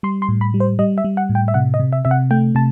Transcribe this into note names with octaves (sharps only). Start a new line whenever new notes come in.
G3 C6
C6
A2
B5
G3
C5
G3 D#5
E5
G3
F#5
A2
G5
E5
C3 F#5
D#5
C3
E5
C3 E5
F#5
A3 G5
C3 A5